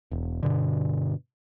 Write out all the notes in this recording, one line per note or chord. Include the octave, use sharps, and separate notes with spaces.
E1
G2 B2 D3